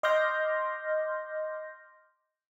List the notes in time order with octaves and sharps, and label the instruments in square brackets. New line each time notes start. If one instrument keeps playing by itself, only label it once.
[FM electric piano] D#5 C6 D6 F6 G6 A#6